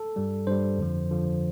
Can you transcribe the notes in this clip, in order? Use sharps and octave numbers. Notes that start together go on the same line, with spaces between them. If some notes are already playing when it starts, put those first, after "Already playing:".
Already playing: A4
G2 G3
G2 G3 C5
F2 D3 F3
F2 D3 F3